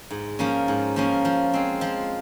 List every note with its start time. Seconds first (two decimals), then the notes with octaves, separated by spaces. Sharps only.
0.10 G#2
0.39 F3 A#3 C#4
0.68 G#2
0.96 F3 A#3 C#4
1.25 F3
1.54 G#3 C4
1.81 F3